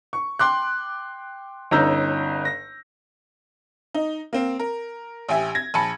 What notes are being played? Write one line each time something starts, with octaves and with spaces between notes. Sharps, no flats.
C#6
G5 C6 D6 F#6
G1 C#4 D#4 A#5 E6 G6
A#6
D#4
A#3 C4
A#4
A1 G4 E5 G#5
G#6 A#6
A#1 G#5 A5 B5 C#7